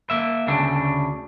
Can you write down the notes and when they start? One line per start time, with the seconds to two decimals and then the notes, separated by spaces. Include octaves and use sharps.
0.10 A#3 E5
0.47 D2 C#3 D4